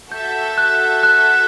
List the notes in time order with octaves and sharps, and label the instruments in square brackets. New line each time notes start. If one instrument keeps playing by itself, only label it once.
[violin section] F#4 A4 E5 [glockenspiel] G6
[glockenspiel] F#6
F#6